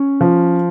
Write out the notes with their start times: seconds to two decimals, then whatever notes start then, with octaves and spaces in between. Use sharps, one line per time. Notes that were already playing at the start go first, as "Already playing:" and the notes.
Already playing: C#4
0.21 F3